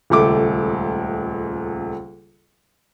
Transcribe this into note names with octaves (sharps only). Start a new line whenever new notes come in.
D#1 C#2 A3 D6